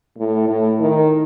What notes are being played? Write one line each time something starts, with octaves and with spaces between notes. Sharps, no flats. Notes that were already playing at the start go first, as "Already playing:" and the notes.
A2
A2
D#3